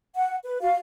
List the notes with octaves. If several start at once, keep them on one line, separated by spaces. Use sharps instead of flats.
F#5
B4
F#4 F5